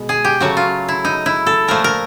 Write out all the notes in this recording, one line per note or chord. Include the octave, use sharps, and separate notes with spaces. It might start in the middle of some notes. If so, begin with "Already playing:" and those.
Already playing: B2 G#3
G#4
G4
C#3 F#3 A3 F#4
F4
E4
D#4
E4
A4
A#2 F3 A3 A#4
A#4